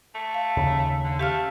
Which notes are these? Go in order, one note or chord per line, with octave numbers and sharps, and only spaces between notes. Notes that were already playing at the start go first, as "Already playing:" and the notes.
A3
F5
D#2 C#3
D3
A3 G4 F5 F6